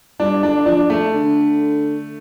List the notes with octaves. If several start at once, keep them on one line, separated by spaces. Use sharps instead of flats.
G2 D4
D3 D4
F3 D4
A3
D3